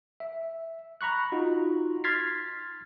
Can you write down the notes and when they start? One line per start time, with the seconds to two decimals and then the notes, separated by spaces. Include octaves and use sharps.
0.20 E5
1.01 A#5 B5 C#6 F#6
1.32 D#4 F4 F#4
2.04 C6 F6 G#6 A6 B6 C7